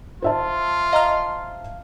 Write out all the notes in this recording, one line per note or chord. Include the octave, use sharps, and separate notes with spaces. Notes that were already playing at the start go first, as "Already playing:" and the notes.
F4 C5 E5 A5
D#5 F5 A#5 F6